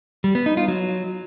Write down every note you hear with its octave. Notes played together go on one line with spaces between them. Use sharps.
G3
B3
D#4
F4
F#3